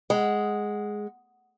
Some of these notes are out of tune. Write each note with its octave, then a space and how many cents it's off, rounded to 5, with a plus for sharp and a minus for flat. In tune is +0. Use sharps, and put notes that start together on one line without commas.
G#3 +0 F#5 +0